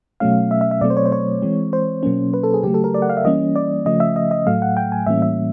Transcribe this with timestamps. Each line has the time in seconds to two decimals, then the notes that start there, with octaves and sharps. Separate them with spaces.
0.20 B2 F#3 A3 C#4 F5
0.51 E5
0.61 E5
0.71 E5
0.81 B2 F#3 A3 C4 D5
0.90 C5
0.97 C#5
1.06 C5
1.12 C#5
1.42 E3 G#3 C4
1.73 C5
2.03 B2 F#3 A#3 C#4
2.34 B4
2.44 A4
2.54 G#4
2.63 C#3 F#3 A3 G4
2.74 A4
2.84 A#4
2.94 D5
3.02 F#5
3.10 F5
3.17 E5
3.25 E3 G3 A#3 C#4 D#5
3.56 D5
3.86 C#3 F3 A3 C#4 D#5
4.00 E5
4.16 D#5
4.31 D#5
4.47 A2 F#3 A3 F5
4.62 F#5
4.77 G5
4.92 G#5
5.07 A2 E3 G3 A#3 C#4 E5
5.22 E5